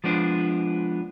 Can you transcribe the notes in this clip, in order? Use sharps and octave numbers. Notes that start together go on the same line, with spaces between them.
F3 G#3 B3 D4 C5